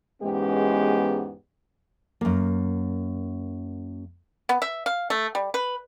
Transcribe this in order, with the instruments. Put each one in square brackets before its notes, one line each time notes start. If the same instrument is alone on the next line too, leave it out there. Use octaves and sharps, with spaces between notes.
[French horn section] E2 G#2 G#3 B3 C#4 G4
[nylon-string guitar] F#2 A#3
[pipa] B3
E5
F5
A3
G3
B4